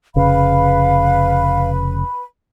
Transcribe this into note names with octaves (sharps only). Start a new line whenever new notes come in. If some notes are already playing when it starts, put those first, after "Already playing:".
F1 C#3 B4 F5 B5